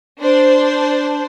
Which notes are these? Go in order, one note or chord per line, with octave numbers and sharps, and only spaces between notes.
D4 C5